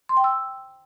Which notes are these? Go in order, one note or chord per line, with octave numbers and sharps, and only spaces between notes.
C6
G5
E6